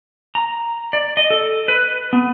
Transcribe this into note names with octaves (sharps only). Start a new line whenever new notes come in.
A#5
D5
D#5
A4
B4
B3